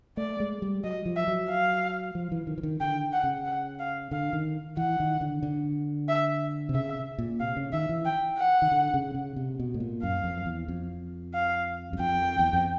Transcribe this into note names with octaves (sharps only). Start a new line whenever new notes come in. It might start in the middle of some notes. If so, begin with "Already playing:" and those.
A3 D5
G#3
G3
F#3 D#5
F3
E5
F#3
F5
F3
E3
D#3
E3
D#3
D3 G5
F#5
C#3
F#5
F5
D3 F5
D#3
E3 F#5
D#3
D3
D3
E5
C3
C#3 E5
A#2
C3 F5
C#3
D#3 E5
E3
G5
F#5
D#3
D3
C#3
C#3
C3
B2
A2
A#2
F#2 F5
F2
E2
F2
F5
F#2
F2 G5
E2
F2